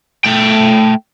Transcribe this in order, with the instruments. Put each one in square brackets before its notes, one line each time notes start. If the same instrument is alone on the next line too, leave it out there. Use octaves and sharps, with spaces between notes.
[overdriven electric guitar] A3 G5